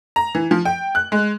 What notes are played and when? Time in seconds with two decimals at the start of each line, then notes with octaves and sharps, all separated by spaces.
0.16 A#5
0.35 E3
0.51 F3
0.65 G5
0.95 F#6
1.12 G#3